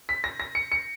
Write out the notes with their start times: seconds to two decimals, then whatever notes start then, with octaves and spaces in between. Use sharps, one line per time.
0.09 B6
0.24 A#6
0.40 A#6
0.55 C#7
0.72 C#7